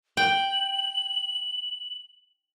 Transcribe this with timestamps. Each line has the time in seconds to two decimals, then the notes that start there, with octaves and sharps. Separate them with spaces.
0.17 G5 F#7